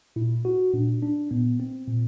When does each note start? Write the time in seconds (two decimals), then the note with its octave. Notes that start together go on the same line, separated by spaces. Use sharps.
0.16 A#2 E4
0.45 F#4
0.73 A#2 D4
1.02 D4
1.31 A#2 B3
1.60 C4
1.88 A#2